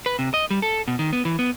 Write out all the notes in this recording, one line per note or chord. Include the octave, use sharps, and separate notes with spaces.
B4
C3
D#5
G3
A4
B2
D#3
B3
E3
B3